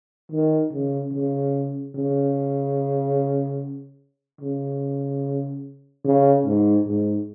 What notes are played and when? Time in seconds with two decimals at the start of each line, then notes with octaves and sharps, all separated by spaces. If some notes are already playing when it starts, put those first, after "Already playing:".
0.32 D#3
0.72 C#3
1.13 C#3
1.96 C#3
4.41 C#3
6.05 C#3
6.46 G#2
6.87 G#2